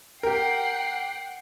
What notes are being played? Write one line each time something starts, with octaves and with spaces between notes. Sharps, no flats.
G4 A#4 F#5 G5 C7